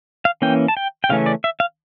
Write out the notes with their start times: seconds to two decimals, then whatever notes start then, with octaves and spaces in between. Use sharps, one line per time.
0.25 F5
0.42 E3 A#3 C#4 G5
0.68 A5
0.77 G5
1.04 G5
1.09 C#3 E3 A3 C#4 F5
1.26 D5
1.44 E5
1.60 F5